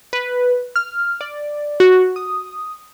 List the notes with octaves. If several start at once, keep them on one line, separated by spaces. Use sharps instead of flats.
B4
F6
D5
F#4
D#6